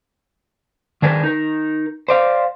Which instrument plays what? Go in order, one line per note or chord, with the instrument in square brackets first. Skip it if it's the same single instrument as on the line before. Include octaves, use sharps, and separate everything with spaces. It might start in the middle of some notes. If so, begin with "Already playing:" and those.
[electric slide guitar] D#3 D4 G#4 A#4 B4
D#4 A#4
C5 D5 F5